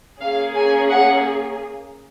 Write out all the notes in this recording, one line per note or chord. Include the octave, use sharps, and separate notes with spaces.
A#3 C#4 G#4 F5
G#5
F#5